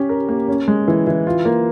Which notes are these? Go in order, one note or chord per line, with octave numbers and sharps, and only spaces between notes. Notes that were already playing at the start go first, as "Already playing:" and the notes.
Already playing: C#4 G4
A#4
A#3
C#4
G#3
E3
E3
F4
A#3